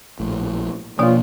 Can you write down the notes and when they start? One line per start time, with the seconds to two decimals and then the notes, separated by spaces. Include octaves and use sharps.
0.20 A#1 A2
0.99 B2 F3 A#3 D4 F4 C#5 D5